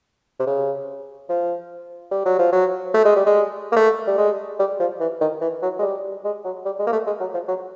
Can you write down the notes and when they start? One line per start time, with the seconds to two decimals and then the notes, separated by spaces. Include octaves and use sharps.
0.40 C3
0.47 C#3
1.29 F3
2.11 G3
2.26 F#3
2.39 F3
2.52 F#3
2.94 A3
3.05 G#3
3.16 G3
3.27 G#3
3.72 A#3
3.76 A3
4.07 G3
4.18 G#3
4.59 G3
4.80 F3
5.00 E3
5.21 D#3
5.42 E3
5.62 F#3
5.79 G#3
5.82 G3
6.24 G#3
6.44 F#3
6.65 G3
6.79 G#3
6.87 A#3
6.92 A3
7.07 G#3
7.20 F#3
7.34 F3
7.48 F#3